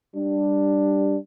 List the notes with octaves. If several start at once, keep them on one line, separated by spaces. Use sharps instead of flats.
G3 D4